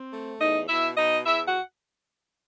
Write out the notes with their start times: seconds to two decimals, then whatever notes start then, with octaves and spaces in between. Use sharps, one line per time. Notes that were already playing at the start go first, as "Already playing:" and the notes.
Already playing: C4
0.11 A3
0.40 E2 D#4 D#5
0.68 B2 E4 E5
0.97 B2 D#4 D#5
1.26 E2 E4 E5
1.47 F#4 F#5